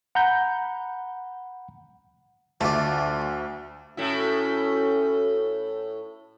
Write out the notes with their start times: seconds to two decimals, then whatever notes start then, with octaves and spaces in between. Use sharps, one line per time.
0.15 F#5 A#5 B5 G6
2.61 D2 A3 F4 D5
3.97 A2 C#4 E4 F#4